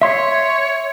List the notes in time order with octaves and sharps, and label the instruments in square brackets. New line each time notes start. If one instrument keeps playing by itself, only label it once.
[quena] C#5 [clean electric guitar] E5 C6